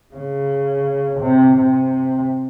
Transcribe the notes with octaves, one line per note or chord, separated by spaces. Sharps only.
C#3
C3
C3